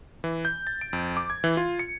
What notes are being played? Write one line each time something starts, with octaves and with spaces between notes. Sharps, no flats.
E3
G6
A6
D7
F2
D6
G#6
E3
F4
C#7